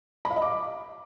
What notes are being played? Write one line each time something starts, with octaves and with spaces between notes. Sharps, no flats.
B5
F5
D#5
D6